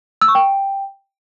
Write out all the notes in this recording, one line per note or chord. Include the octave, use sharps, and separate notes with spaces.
E6
C#6
G5